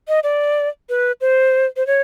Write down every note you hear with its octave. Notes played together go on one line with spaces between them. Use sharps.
D#5
D5
B4
C5
C5
C#5